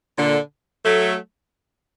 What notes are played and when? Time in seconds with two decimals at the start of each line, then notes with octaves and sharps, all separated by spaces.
0.17 A#2 D3
0.85 F#3 A3